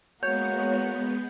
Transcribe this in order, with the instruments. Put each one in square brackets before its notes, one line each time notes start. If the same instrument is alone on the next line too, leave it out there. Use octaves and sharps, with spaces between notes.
[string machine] G#3 B3 [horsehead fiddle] A#3 F#4 [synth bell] C#5 [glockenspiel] G6